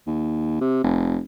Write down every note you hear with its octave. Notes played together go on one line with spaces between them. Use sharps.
D#2
C3
F1